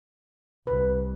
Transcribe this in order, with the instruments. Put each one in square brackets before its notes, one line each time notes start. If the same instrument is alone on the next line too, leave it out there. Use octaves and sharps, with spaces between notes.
[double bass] C2 [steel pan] B4